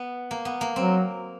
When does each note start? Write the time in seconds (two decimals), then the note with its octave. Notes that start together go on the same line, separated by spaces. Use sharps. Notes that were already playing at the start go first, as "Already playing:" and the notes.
Already playing: B3
0.31 A#3
0.45 B3
0.61 A#3
0.75 F#3 C4